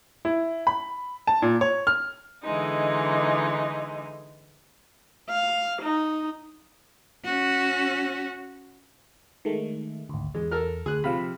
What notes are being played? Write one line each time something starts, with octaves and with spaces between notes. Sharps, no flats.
E4
B5
A5
A#2
C#5
F6
D3 E3 G#3 D#4
F5
D#4
C#4 F#4
D#3 G#3 A3
G#1 D2
E2 G#3
A4 A#4 F6
D2 G#4 F#6
C3 F3 F5 B5